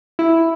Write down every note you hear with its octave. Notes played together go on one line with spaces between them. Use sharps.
E4